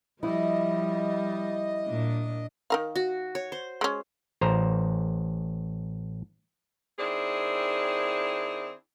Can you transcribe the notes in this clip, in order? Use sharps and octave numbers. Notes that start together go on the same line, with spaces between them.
F3 G3 E4 D#5
A#2 D4
D#3 A#4 F5
F#4
C#5
C5
G#3 C#4
A1 C5 A#5
D#3 C4 D4 E4 G#4